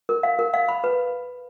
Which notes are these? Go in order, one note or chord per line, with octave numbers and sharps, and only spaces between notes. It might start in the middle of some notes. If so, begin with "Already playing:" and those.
A#4
F5
A#4
F5
B5
B4